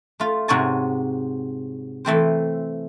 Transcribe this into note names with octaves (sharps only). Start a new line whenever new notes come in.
A3 F4
G#2 C3 F#4 C#5 G#5 A5
E3 A3 C4 C5